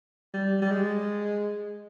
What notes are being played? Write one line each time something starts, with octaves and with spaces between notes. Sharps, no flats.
G3
G3
G#3